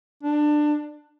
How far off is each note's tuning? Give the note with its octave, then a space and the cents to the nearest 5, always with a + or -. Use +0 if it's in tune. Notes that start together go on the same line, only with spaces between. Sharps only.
D4 +20